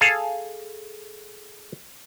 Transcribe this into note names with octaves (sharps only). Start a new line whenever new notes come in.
G#4 A4 F5